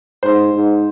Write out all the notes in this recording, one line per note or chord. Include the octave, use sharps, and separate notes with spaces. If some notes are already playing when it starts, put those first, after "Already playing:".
G#2 C5
G#2